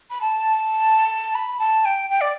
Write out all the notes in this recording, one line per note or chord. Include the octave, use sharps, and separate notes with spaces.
B5
A5
B5
A5
G5
G5
D5